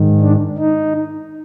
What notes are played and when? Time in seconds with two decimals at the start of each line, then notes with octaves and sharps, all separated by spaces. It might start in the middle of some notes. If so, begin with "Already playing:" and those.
Already playing: G#2 D#3
0.21 D4
0.59 D#4